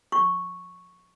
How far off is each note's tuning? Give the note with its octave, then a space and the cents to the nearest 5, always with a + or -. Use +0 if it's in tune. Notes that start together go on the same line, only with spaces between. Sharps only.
C#6 -5